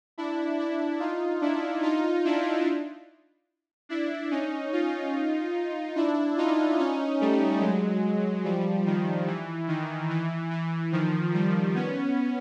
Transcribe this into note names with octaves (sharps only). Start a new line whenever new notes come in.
D4 E4
D4 E4
D#4 F4
D4 E4
D#4 F4
D4 E4
D4 E4
C#4 D#4
D#4 F4
D4 E4
D#4 F4
C#4 D#4
G3 A3
F#3 G#3
F3 G3
D#3 F3
E3
D#3
E3
E3
D#3 F3
F3 G3
B3 C#4